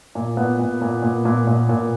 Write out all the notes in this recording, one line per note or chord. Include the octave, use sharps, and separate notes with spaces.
A#2
A#2 B3
A#2
A#2
A#2
A#2
A#2
A#2